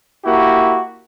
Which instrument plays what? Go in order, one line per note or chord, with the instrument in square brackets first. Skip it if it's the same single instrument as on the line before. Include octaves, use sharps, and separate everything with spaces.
[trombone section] A#3 E4 F#4 G4